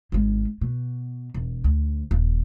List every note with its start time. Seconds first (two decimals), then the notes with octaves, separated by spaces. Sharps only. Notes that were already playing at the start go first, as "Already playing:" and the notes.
0.12 G#1 G#3
0.61 B2
1.34 E1
1.64 D2
2.11 D#1